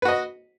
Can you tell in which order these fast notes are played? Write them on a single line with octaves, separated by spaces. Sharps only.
B4 F#4 D#5